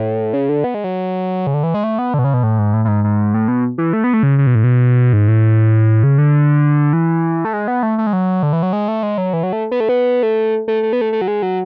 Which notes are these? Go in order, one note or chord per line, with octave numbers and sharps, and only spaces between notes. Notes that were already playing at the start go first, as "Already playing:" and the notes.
Already playing: A2
C#3
D3
B3
G#3
F#3
C#3
D3
E3
G#3
A3
B3
D3
B2
C#3
B2
A2
G#2
A2
A2
G#2
G#2
A2
B2
E3
A3
B3
A3
C#3
C#3
B2
A2
B2
G#2
A2
C#3
D3
E3
A3
G#3
B3
A3
A3
G#3
F#3
D3
E3
F#3
G#3
A3
G#3
F#3
E3
F#3
A3
B3
A3
B3
A3
A3
A3
B3
A3
A3
F#3
G#3
F#3